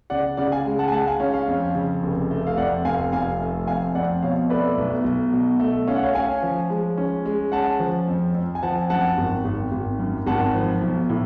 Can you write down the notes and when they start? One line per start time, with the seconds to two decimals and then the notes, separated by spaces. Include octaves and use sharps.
0.10 C#3 D5 F#5
0.37 C#3 D5 F#5
0.52 F5 G#5
0.66 G#3
0.79 F#5 A5
0.88 G#5
0.92 G#3 F#5 A5
1.07 F5 G#5
1.20 C#4 C#5 F5
1.34 C#5 F5
1.48 F2
1.75 C#3
2.03 F1
2.31 A3
2.47 F5
2.57 F2 D5 F#5
2.85 F1 F5 G#5
3.12 F1 F5 G#5
3.41 A3
3.67 F2 F5 G#5
3.95 F2 D5 F#5
4.22 B2 C#5 F5
4.49 A3 B4 D5
4.77 B1
5.04 B1
5.33 B2
5.60 A3
5.88 C#4 F5
5.95 F#5
6.03 C#5 F5
6.14 C#4 F5 G#5
6.42 F3
6.70 G#3
6.97 C#4
7.25 G#3
7.52 C#4 F#5 A5
7.79 F3
8.08 F2
8.34 F2
8.55 G#5
8.63 F3 F#5 A5
8.78 G#5
8.90 F#2 F#5 A5
9.18 G#1
9.45 G#1
9.72 G#1
9.99 F#2
10.27 G#1 F#5 A5
10.54 F3
10.81 B1
11.09 A2